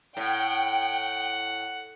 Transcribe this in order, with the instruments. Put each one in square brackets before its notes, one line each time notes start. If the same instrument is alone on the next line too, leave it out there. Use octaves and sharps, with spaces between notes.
[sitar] A2 [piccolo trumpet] F#5 [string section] G5